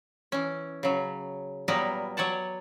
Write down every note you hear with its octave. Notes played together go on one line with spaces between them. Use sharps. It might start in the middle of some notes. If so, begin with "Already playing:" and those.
E3 C#4
C#3 F#3
A#2 F#3 G3 B3 A#4 B4
F#3 C#5 D5 F#5 A5